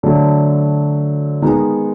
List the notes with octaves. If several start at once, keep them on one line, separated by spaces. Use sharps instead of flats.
D3 F#3 A3
D#3 G#3 B3 D#4